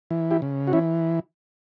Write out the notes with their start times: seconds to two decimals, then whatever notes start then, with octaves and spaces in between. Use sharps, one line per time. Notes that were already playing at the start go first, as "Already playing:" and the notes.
0.11 E3
0.31 E4 G4
0.42 C#3
0.67 F#4
0.73 E3 C#4 E4